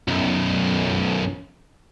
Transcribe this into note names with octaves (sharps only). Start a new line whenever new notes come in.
B1 F#2